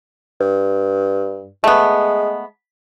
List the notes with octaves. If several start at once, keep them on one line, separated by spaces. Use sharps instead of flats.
G2
G#3 A3 B3